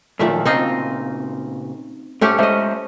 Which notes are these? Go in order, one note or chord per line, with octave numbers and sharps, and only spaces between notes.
F#2 A#2 D#3 F3 A3 E5
A#2 C#3 C4 D#4 F4
G#2 A3 C#4 G4
G#3 C#4 C5 D#5 E5